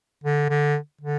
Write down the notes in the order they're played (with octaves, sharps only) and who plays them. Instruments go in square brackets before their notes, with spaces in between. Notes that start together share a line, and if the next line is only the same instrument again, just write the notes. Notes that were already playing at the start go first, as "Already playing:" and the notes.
[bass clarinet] D3
D3
D3